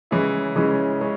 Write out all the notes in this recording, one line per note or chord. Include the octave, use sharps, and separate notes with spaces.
C#3 E3 G#3 C#4 E4
C#3 E3 G#3 C#4 E4
C#3 G#3 C#4